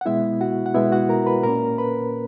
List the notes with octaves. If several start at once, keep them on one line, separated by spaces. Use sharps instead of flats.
F#5
B2 G#3 B3 E4 E5
F#4 F#5
F#5
B2 G#3 B3 E4 E5
F#4 F#5
A#4 A#5
B4 B5
A#2 A#3 C#4 A#4 A#5
B4 B5